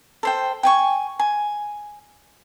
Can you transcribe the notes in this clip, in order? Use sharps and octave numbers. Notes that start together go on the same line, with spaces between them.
A4 C5 G5
G5 G#5 C#6
G#5